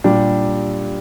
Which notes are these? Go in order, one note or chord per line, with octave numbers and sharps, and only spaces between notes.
A#2 G3 D4 G4